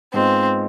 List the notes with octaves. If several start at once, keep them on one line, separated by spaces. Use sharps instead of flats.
G#2 G#3 B3 C4 F4